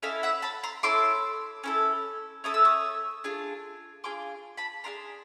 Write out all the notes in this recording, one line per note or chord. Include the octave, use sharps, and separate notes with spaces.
C#4 E4 A4 D#5 F5
E5 F#5
A5 B5
A#5 C6
C#4 E4 A4 C6 D6
C#4 E4 A4
C#4 E4 A4 D#6
E6
C#6 D#6
D4 F4 G#4
D4 F4 G#4 C6 D6
A5 B5
D4 F4 G#4 A#5 C6